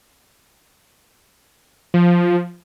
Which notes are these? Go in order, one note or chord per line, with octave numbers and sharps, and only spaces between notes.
F3